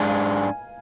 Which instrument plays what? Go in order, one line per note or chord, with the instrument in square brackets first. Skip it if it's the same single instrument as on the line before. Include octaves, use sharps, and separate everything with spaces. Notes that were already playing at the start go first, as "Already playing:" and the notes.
Already playing: [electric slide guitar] G#2 G#3 D4 [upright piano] F5 G#5